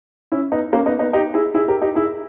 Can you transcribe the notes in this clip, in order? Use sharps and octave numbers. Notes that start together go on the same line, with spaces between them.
C#4 E4
B3 D#4
A#3 C#4
B3 D#4
B3 D#4
D#4 G4
E4 G#4
E4 G#4
G4 A#4
D#4 G4
E4 G#4